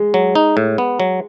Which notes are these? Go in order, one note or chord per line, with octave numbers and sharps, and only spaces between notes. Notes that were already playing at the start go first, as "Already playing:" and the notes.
Already playing: G#3
F#3
D#4
A2
B3
F#3